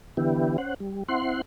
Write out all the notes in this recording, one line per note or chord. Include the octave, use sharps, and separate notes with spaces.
D3 E3 B3 E4 G4
C#4 C5 F#5
G3
C4 E4 F#5 C6